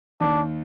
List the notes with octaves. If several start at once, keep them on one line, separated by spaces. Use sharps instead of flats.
D#2 D#3 D4